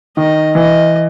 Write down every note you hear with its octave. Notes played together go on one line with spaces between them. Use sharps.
D#3 D#5
E3 D#5